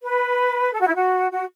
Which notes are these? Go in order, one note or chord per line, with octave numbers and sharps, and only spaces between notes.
B4
A4
F#4
E4
F#4
F#4